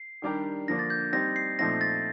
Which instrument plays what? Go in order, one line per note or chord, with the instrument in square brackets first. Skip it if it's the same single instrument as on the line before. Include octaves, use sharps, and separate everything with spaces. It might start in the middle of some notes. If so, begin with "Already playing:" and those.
Already playing: [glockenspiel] C7
[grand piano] D#3 G3 D4 G4 A#4
[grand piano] D3 F3 A#3 D4 [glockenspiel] A#6
[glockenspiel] A6
G6
[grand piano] G3 C4 D#4 [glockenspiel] A#6
[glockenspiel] C7
[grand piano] A#2 F3 A3 C4 D#4 [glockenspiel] A#6
[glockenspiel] A6